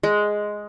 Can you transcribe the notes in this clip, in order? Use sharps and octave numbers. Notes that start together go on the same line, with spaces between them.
G#3